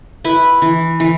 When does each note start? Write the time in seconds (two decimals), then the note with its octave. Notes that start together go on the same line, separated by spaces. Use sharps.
0.25 E4 B4
0.62 E3
1.00 E3